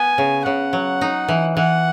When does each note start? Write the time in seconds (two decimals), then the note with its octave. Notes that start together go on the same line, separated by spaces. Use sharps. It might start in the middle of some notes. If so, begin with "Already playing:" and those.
Already playing: B3 G#5
0.18 C#3
0.46 C#3 F#5
0.73 F#3
1.01 D#4
1.29 E3
1.56 E3 F#5